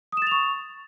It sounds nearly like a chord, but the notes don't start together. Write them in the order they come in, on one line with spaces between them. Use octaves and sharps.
D#6 E7 A6 F7 C#6